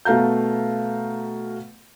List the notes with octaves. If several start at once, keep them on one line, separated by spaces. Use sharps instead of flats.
B2 A3 F5 A#5 G6